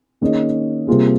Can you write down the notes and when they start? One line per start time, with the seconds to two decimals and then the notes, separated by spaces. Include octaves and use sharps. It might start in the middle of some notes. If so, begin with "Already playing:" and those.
0.21 D#3 A#3 C#4 G#4 D#5
0.87 C3 G3 A#3 F4 G#4